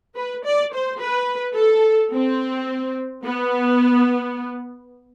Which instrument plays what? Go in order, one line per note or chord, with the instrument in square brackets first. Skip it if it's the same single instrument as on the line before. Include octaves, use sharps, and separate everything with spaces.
[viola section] B4
D5
C5
B4
A4
C4
B3